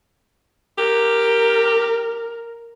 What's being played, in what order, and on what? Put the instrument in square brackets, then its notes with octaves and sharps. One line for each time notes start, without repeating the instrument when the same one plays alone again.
[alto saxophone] G4 [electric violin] A#4